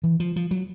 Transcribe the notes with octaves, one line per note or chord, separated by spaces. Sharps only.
E3
F3
F3
F#3